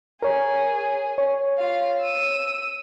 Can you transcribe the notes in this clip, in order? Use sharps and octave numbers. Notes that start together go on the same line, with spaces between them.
G#4 A#4 C#5
C#5
F4 F5
E6 D#7